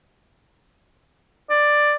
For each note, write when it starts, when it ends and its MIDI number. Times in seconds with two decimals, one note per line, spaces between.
1.50 1.94 74